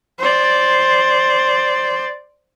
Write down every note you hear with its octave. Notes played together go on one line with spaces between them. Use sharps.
C5 D5